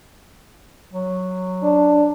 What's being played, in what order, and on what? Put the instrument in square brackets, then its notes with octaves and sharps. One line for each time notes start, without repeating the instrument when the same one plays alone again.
[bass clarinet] F#3
[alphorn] D4